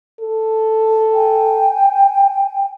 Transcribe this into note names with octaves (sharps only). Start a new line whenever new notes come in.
A4
G5 G#5